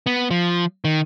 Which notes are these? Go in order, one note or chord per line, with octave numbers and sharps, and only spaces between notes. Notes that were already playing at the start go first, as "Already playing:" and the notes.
B3
F3
D#3